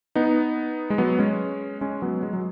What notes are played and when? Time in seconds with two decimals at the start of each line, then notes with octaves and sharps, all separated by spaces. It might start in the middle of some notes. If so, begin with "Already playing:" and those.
0.16 B3 D#4
0.90 G#3
0.98 F#3 B3
1.19 G#3 C#4
1.81 G#3 C#4
2.02 F#3 B3
2.23 G#3
2.33 F#3